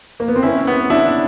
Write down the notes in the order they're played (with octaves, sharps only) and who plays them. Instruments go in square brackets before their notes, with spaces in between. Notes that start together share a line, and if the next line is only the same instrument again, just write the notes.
[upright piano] A#3
B3
C4
[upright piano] C#4 [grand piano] E4
[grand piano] B3
[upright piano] D4 [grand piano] E4